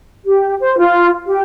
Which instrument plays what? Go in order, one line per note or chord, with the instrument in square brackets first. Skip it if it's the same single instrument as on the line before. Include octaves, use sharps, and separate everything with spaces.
[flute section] G4
C5
F4
G4